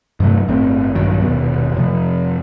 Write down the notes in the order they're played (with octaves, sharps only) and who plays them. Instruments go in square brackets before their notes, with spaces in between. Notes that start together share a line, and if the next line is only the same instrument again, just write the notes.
[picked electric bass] G2 C3 F#3 A3
G1 A2 C4
A#1 G2 D#3 F#3
D#1 D#2 B2 B3
F2 C3 F3